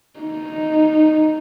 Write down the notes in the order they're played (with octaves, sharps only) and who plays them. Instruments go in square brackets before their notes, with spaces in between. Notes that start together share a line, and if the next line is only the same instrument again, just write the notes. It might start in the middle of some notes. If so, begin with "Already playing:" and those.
[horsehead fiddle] D#4